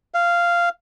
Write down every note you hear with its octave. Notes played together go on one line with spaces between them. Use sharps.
F5